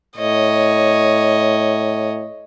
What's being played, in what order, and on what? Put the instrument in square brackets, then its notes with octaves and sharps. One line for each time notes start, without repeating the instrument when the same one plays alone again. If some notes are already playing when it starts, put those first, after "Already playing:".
[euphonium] A2 [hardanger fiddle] C#5 D#5